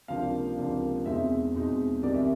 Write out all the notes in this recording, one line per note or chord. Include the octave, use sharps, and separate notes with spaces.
C#2 C3 F3 A#3 D4 F5
C#2 C3 F3 A#3 D4
E2 B2 G#3 C4 D#4 E5
E2 B2 G#3 C4 D#4
C2 C3 D#3 G3 D5
E5